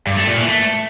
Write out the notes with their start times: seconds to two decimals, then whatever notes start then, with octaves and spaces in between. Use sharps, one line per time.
0.07 G2
0.17 A3
0.28 A#2
0.38 E3
0.48 A3